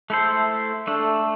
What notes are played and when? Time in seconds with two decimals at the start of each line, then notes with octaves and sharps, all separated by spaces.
0.10 A3 E4 A4 C5
0.87 A3 D4 A4